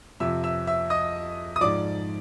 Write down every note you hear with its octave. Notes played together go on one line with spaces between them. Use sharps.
F2 C3 F3 E5 E6
E5 E6
E5 E6
D#5 D#6
D#6
G#2 F3 D5 D6